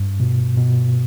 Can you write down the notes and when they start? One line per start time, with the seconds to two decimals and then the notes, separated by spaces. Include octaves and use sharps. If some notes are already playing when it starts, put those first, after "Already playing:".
Already playing: G2
0.20 B2
0.57 B2